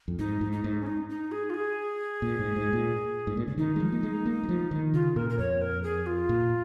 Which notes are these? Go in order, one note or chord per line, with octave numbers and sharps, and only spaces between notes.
F2
G#2 D#4
G#2
D#4
G#2
C#4
D#4
D#4
G#4
F4
G#4
A#2
G#2
G#2
A#2
G#2
A#2
C#3
D#3 D#4
G#3
F3
A#3
G#3
A#3
G#3
F3
D#3
C#3 F4
A#2 A#4
A#4
F2 C#5
A#4
G#4
F4
A#2